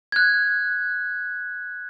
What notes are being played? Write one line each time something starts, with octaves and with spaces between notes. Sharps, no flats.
F#6 G#6